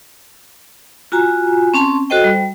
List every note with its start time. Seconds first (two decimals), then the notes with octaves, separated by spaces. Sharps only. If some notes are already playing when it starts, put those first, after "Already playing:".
1.12 F4 F#4 G#5 A#5
1.74 C4 C#4 A5 C6
2.10 F#4 A4 C5 D#5 G5
2.24 G3